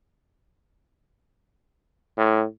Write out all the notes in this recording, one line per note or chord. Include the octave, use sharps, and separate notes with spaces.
A2